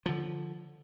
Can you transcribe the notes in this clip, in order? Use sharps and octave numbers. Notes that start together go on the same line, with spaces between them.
D3 F3